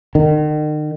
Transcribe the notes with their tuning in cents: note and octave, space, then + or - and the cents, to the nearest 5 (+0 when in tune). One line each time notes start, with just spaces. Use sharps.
D#3 -40